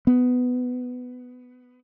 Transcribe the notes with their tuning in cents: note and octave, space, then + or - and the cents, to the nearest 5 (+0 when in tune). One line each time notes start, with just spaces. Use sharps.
B3 +15